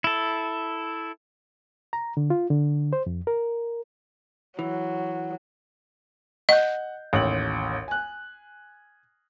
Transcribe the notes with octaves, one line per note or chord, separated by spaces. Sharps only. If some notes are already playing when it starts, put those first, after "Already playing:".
E4 A4
A#5
D3
F4
D3
C5
F2
A#4
E3 F#3
D#5 F#5 G6
A1 D#2 F#7
G#5 F#6